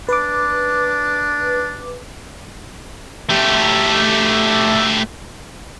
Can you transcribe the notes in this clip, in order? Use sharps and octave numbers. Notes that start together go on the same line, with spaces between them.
D4 B4 D6
A3 G4